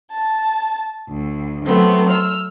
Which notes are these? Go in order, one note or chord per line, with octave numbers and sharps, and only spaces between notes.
A5
D2
F#3 A3 B3 C4
E6 F6